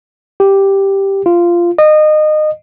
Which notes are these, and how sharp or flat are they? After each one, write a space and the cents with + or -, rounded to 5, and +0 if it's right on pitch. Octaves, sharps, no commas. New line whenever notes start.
G4 +0
F4 -10
D#5 -25